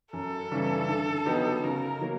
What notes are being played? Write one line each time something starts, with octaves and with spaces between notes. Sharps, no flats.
F#2 A4
C#3 E3 G3
D3
F#3 B3 D#4 G4
C#3 A#4
F#3 A#3